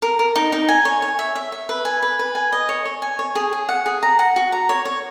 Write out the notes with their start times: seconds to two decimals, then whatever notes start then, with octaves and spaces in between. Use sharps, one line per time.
0.02 A#4
0.19 A#4
0.36 D#4
0.52 D#4
0.69 G#5
0.85 C#5
1.02 C#5
1.19 E5
1.36 E5
1.52 E5
1.69 B4
1.85 G#5
2.02 B4
2.19 B4
2.35 G#5
2.52 D#5
2.69 C#5
2.85 C#5
3.02 G#5
3.19 C#5
3.35 G#4
3.53 G#4
3.69 F#5
3.86 G#4
4.03 A#5
4.19 F#5
4.36 F#4
4.52 A#5
4.69 C#5
4.85 C#5